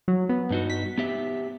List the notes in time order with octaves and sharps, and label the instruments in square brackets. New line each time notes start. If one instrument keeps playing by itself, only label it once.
[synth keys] F#3
B3
[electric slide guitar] G2 D#4 F#4
[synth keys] B6
[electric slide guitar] B3 G4 E5